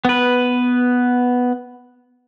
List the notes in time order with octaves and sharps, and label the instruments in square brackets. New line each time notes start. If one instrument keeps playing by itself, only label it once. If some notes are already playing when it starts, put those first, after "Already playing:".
[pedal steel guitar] B3 B4